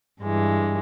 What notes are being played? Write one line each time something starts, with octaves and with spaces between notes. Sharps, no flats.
G2 E3 G#3